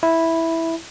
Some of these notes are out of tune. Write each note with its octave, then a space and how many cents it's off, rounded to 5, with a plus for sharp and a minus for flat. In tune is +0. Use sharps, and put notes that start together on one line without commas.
E4 -5